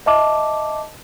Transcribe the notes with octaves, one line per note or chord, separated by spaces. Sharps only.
D#5 E5 A5 D6